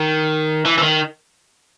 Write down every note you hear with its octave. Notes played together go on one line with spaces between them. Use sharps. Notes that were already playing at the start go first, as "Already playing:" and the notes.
Already playing: D#3
E3
E3
D#3